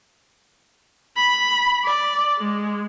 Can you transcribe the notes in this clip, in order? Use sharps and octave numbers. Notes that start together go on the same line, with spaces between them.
B5
D5
G#3